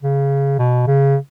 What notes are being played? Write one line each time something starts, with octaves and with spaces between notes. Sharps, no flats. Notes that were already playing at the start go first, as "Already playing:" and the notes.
C#3
B2
C#3